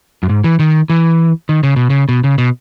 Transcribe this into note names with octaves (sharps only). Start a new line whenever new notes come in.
F#2
G#2
E3
D#3
E3
D#3
C#3
B2
C#3
B2
C#3
B2